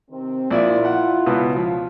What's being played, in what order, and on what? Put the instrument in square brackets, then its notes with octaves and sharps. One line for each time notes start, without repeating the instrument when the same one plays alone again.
[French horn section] C3 D#3 C4
[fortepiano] A#1 D5 E5 [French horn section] E4 F4
[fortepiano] F#5
C#2 B2 B3
F3